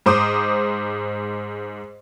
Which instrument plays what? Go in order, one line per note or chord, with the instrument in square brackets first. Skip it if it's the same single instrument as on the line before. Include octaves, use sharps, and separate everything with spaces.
[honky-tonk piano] G#2 C5 D6 D#6